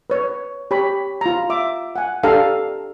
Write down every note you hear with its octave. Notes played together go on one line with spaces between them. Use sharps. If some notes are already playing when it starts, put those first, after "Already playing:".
B4 C#5
G4 C#5 B5
F4 A#5
E5 D6
F#5 G#5
D4 G4 A4 F5 A#5